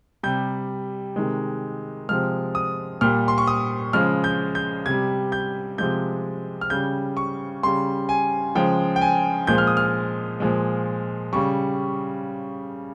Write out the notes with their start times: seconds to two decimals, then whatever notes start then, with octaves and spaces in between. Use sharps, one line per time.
0.23 C3 G3 G6
1.16 C3 D#3 G#3
2.09 C3 F3 G#3 F6
2.55 D#6
3.01 A#2 G3 F6
3.28 C6
3.38 C#6
3.47 D#6
3.93 C#3 F3 G#3 F6
4.24 G6
4.55 G6
4.86 C3 G3 G#6
5.32 G6
5.78 C3 F3 G#3 G6
6.61 F6
6.70 C#3 G3 G6
7.17 C#6
7.63 C#3 G3 C6
8.09 G#5
8.55 C#3 F3 G#3 G5
8.96 G5
9.01 G#5
9.47 A#2 F3 G#3 G6
9.58 F6
9.67 D#6
9.77 F6
10.40 A#2 F3 G#3
11.33 C#3 G3 C#6